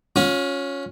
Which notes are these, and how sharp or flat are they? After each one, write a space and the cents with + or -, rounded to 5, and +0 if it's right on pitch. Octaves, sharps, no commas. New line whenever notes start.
C#4 +0 F4 +35